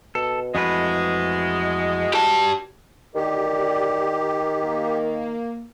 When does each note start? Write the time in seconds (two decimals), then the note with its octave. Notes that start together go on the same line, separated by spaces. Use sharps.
0.15 B2 A4
0.55 F2 E3 G#3 A3 F#4 B4
2.14 G4 A5
3.15 D2 D#3 G4 A#4 D5
4.64 A#3